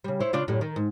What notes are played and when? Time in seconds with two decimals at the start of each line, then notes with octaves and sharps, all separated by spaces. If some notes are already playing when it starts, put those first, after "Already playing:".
0.04 C#3 G3
0.20 E4 C5 C#5
0.33 C#3 D4 F4
0.48 F#2 A2 G3
0.61 D#3
0.76 G#2